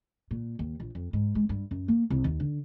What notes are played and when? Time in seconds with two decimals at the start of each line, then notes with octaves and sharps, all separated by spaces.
0.31 A#2
0.59 D#2
0.80 A#1
0.95 F2
1.13 G#2
1.35 G#3
1.49 G2
1.71 F#2
1.88 A#3
2.10 C2
2.24 D#2
2.40 D3